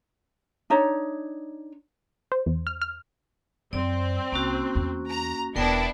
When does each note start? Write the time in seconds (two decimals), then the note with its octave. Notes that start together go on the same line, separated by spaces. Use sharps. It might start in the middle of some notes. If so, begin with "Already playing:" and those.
0.70 D4 D#4 C#5
2.32 C5
2.46 E2
2.67 F6
2.82 F6
3.73 F#2 C4 D5
4.32 C2 A#3 C#4 F#4
4.75 E2
5.09 A#5
5.56 E1 B3 D4 E4 A#4 G5